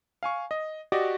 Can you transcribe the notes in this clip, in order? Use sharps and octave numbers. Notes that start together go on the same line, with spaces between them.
F5 G#5 C#6
D#5
F#4 G4 D5 D#5